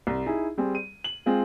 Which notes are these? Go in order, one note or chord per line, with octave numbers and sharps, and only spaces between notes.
C2
D#4 E4 G#4
G3 C4 G#4
D#7
F#7
G#3 C4 F4 G#4